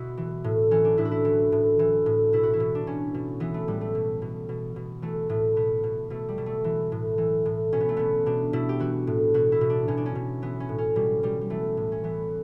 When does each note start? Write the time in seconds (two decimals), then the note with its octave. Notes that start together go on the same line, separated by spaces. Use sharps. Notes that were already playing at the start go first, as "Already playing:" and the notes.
Already playing: B2 E4 F#4
0.17 E3
0.44 A2
0.71 E3 C#4
0.85 D4
0.98 A2 E4
1.05 F#4
1.11 E4
1.25 E3
1.52 A2
1.79 E3
2.06 A2
2.33 B2 E4
2.43 F#4
2.53 E4
2.60 B2
2.75 D4
2.87 B2 C#4
3.14 B2
3.40 E3 B3
3.54 A3
3.68 A2 G3
3.81 A3
3.95 B2
4.22 B2
4.49 B2
4.76 B2
5.02 E3 A3
5.30 A2 A3
5.56 B2 B3
5.83 B2
6.10 B2 A3
6.29 G3
6.38 B2
6.46 A3
6.64 E3
6.92 A2
7.18 E3
7.45 A2
7.73 B2 C#4
7.80 B3
7.89 A3
7.97 B2 B3
8.26 B2 D4
8.53 B2 E4
8.69 G4
8.79 E3 F#4
9.07 A2
9.34 B2 F#4
9.52 E4
9.61 B2
9.70 D4
9.88 B2 C#4
9.97 D4
10.06 C#4
10.15 B2
10.42 E3 B3
10.60 C#4
10.69 A2
10.78 C#4
10.96 B2 G3
11.23 B2 G3
11.41 G3
11.50 E3 A3
11.77 A2
11.92 C#4
12.03 E3 B3